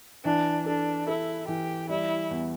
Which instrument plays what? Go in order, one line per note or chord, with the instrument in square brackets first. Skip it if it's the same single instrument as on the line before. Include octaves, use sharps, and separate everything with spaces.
[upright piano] E3 [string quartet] D4
[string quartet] D4 [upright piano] A4
[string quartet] E4 [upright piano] A4
[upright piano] E3 [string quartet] G4
[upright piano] G3 [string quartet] E4
[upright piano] E2